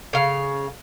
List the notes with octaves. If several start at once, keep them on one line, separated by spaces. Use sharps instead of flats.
C#3 F5